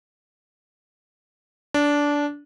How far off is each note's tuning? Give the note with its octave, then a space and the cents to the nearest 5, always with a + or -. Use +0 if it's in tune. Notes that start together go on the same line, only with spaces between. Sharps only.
D4 -15